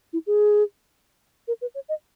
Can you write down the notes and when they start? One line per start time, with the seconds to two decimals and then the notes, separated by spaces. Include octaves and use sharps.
0.13 E4
0.27 G#4
1.48 A#4
1.61 B4
1.75 C#5
1.89 D#5